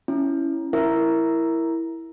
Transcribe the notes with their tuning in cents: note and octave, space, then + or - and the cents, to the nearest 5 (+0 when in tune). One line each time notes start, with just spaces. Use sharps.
C#4 +0 E4 +0
E4 +0 A#4 +0 E5 +0